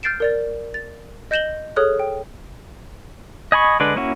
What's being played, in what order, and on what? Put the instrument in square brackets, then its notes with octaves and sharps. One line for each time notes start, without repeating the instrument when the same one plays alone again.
[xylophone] F6 G6 A6 C7 D7 E7
A#4 D5 A6
A6
D#5 G6 A#6 E7 F#7 G7
G#4 A4 C#5 D#6 F6 F#6
G5
[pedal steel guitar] D#5 G#5 B5 C#6
D3 G#3 D4 B4
A#3 C#4 E4 F#4